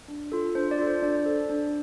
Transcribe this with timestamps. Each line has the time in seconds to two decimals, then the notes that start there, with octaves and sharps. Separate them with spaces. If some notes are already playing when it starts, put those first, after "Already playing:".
0.08 D4
0.32 F4 A4
0.55 D4 C5
0.71 D5
0.79 F4 A4
0.87 C5
1.02 D4 D5
1.26 A4
1.49 D4